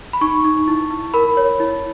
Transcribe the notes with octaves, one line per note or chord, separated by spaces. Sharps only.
B5
D#4 C#6
D#4
E4
E4
A#4 B5
C#5
E4